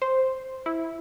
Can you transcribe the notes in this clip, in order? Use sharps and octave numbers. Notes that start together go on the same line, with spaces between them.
C5
E4